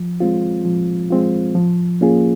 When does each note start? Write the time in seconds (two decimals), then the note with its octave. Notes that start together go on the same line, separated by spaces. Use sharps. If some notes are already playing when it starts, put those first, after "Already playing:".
Already playing: F3
0.20 G#3 C4 F4
0.65 F3
1.11 G#3 C4 F4
1.55 F3
2.01 A#3 C#4 F4 G#4